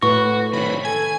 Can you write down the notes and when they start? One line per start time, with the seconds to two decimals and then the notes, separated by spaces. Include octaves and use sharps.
0.03 A2 F#4 B4 C#6
0.53 C3 D#3 C#5 B5
0.85 A4 G#5 G#6